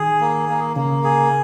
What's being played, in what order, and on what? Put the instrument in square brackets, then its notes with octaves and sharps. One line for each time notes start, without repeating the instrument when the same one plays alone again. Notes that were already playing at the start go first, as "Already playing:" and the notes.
Already playing: [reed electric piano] D#3 [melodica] G#4
[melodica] A#3
A#3
[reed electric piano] C#3 [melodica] A#3
[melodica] G#4